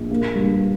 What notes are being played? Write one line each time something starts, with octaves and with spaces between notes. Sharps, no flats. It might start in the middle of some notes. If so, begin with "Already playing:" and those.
Already playing: A#1
A#3
G2